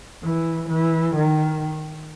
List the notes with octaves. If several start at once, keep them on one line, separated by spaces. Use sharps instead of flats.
E3
E3
D#3